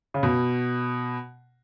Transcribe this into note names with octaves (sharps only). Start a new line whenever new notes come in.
C#3
B2